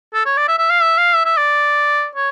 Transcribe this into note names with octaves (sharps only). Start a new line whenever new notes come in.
A4
C#5
D5
E5
E5
F5
E5
F5
E5
E5
D5
C#5